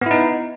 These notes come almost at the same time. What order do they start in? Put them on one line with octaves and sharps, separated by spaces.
B3 E4 D#4